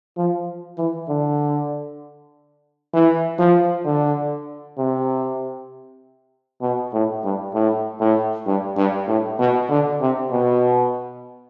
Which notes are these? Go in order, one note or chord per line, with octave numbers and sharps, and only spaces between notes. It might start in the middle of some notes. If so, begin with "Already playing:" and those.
F3
E3
D3
E3
F3
D3
C3
B2
A2
G2
A2
A2
G2
G2
A2
B2
D3
C3
B2